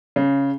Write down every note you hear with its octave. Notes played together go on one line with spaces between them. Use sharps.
C#3